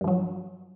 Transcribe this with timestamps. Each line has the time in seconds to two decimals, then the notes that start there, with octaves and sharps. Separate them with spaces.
0.01 G2
0.04 F3
0.08 F#3